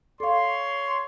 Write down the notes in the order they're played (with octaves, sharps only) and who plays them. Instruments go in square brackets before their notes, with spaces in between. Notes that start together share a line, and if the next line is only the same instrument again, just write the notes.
[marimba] A4 F5 [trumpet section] C#5 C6